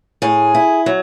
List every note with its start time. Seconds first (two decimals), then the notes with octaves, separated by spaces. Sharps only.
0.22 A2 G#4
0.55 E4
0.86 F#3